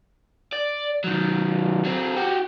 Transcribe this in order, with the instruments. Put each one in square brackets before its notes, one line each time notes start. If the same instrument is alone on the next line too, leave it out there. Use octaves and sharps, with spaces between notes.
[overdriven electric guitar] D5
D#3 F#3
F#3 C4
F#4 G4